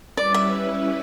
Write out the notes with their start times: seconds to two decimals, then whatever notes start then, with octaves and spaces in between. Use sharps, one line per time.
0.17 G3 C#4 E4 B4 D5
0.34 E5